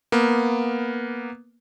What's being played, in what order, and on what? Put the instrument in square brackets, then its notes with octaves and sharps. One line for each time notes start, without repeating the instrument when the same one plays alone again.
[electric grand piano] A#3 B3